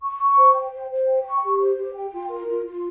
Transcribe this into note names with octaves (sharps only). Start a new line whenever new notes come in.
C#6
C#6
C5
G5
C5
C5
G5
C#6
G4
C5
G4
G5
F4
A#4
F4
F4